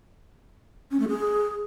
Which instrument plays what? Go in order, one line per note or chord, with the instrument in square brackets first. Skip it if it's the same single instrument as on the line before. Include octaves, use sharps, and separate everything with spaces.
[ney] C#4
A3
G#4